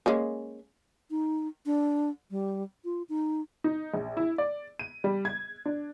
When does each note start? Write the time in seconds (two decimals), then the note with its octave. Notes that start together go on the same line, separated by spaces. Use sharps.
0.06 G#3 A#3 C#4
1.11 D#4
1.66 D4
2.31 G3
2.85 F4
3.09 D#4
3.64 D#4
3.94 A#1
4.17 E4
4.38 D5
4.79 D#7
5.04 G3
5.25 G#6
5.66 D4